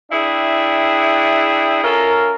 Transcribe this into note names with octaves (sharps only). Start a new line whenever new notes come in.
D4 E4 G#4 E5 G5
C#4 F4 A4 A#4